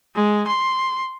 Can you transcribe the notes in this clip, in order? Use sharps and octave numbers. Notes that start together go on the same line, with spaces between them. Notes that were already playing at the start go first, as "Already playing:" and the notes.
G#3
C6